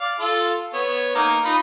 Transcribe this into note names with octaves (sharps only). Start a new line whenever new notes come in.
D5 F5
F4 A4
B3 C#5
A#3 D#4 A#5
D#4 F4 B5